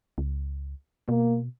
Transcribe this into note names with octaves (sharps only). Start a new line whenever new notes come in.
C#2
B2 A#3